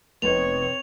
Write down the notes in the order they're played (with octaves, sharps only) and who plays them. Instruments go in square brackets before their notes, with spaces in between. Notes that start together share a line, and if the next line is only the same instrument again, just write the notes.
[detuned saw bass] F1 [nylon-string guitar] B3 D#4 [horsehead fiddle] C4 C#5 [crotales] F7